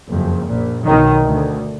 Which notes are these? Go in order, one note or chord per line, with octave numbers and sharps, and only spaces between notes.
F#1 F2
A#1 A#2
B1 B2 D#3
D2